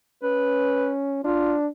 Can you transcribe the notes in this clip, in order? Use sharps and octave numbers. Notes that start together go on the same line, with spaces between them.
C#4 B4
D4 F4